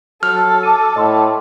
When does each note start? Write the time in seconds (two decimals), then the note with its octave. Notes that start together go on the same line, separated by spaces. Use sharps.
0.23 F#3 A4 F6
0.63 A5 D6 D#7
0.96 A2 D#5 C6 D6